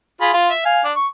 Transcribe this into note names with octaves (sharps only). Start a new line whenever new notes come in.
F4 G#4 B5
F4
E5
F5 G#5
D4
C#6